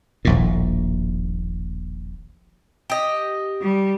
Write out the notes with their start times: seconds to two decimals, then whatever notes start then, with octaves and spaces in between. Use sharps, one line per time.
0.25 D#1 A#1 A2
2.90 G4 D#5
3.61 G3